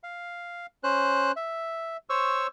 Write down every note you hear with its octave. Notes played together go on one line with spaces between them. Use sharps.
F5
C#4 C5 F#6
E5
C5 C#5 C#6 E6